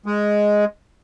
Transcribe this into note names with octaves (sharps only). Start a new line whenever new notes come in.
G#3